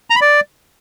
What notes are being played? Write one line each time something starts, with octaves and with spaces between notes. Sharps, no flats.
A#5
B5
D5